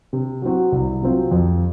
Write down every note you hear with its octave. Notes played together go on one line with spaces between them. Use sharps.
C3
F#3 C4 F#4
C2
C3 F#3 C4 F4
F2